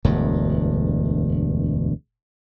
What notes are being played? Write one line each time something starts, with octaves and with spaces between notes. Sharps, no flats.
E1 D2 G2